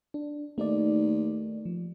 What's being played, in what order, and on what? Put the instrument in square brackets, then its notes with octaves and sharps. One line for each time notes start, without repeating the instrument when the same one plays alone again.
[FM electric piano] D4
[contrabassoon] D#2 [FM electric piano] A3 D#4 D5
[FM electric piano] F3